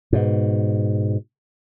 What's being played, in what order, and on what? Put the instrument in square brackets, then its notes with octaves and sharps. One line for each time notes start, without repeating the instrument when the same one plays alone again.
[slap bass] G#2 B2